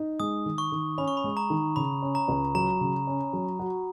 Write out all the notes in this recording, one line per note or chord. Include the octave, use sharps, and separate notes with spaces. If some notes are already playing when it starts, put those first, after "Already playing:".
Already playing: D#4
G#3 D#6
D#3
C#6
D#3
C#4 B5
C#6
B5
G#3
A#5
D#3
C#3 B5
C#4
A#5
C#2
F#3 A#5
C#3
C#4
F#3
F#4